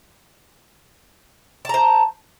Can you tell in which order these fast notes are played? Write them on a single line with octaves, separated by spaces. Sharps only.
A5 A#5 C5